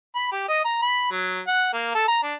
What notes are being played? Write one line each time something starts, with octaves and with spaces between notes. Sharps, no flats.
B5
G4
D#5
A#5
B5
F#3
F#5
A#3
A4
A#5
D4